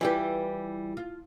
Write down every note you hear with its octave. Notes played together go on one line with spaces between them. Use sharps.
E3 G3 E4 F4 G4 B4
F4